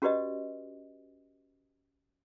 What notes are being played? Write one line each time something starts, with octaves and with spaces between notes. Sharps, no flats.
C#4 F#4 G4 B4 D5 D#5